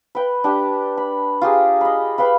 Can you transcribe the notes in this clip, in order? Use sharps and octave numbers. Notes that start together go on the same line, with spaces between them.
B4 G5
D4 G4
B5
F4 G4 G#4 A#4
D#5 B5
B4 F5 G5 B5